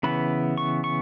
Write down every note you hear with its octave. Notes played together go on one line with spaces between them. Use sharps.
C#3 E3 B3 B5
C#6
C#6